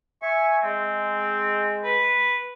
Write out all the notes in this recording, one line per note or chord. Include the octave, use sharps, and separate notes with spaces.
E5 G#5 C#6
G#3 C4
B4